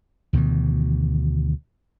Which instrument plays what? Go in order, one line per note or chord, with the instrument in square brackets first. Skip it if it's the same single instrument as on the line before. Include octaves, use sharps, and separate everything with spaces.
[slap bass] D2 B2 D#3 E3